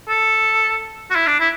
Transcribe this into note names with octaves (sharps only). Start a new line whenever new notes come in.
A4
F#4
E4
D4
E4